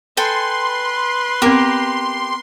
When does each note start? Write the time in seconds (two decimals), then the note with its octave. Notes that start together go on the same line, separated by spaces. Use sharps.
0.17 A4 B4 G5 G#5 C6
1.42 B3 C4 G4 A#4